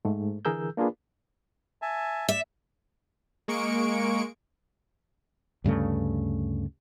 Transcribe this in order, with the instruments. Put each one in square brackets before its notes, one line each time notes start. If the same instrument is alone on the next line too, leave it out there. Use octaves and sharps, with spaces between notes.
[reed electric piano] G#2 A3
D3 E3 G#4 A#4 E6 G6
A#3 D4 F4 G#4 B4
[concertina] E5 G#5 A5
[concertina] D5 [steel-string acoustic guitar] E5
[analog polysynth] G#3 A#3 C#6 C#7 D7
[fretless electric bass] D2 G2 C#3 A3